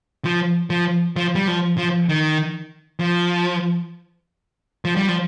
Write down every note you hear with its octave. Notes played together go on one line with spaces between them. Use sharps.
F3
F3
F3
G3
F3
F3
D#3
F3
F3
G3
F3